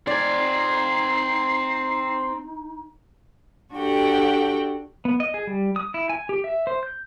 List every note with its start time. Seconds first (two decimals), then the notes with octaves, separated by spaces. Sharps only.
0.07 C4 D#4 D5 G#5 C7
3.74 D4 F#4 G4 A4 F#5 G5
5.05 B3
5.20 D#5
5.34 G#4
5.47 G3
5.76 D#6
5.94 E4
6.09 G#5
6.29 G4
6.44 E5
6.67 C5
6.83 G6